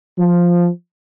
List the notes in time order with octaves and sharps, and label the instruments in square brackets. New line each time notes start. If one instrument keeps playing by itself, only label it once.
[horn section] F3